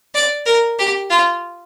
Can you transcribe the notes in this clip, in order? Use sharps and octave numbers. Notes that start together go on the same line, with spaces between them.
D5
A#4
G4
F4